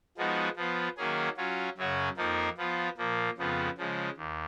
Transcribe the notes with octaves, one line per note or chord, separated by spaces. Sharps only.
F3 G#3 B3 D#4 F#4
F3 B3 F4
D#3 F#3 A#3 C#4 G#4
F#3 C#4 F4
F#2 C#3 F#3 C#4 F#4
F2 F3 A#3 D#4 A#4
F3 B3 F4
A#2 F3 A#3
F2 C#3 F3 B3
C#3 F3 G#3
D#2